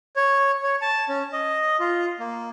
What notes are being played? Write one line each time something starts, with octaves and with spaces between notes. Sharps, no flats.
C#5
C#5
A5
C#4
D#5
F4
A#3